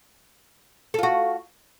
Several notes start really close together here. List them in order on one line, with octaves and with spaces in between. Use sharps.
A4 F4 F#4